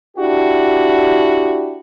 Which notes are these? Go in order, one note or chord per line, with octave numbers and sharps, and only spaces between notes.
D4 E4 F#4 G4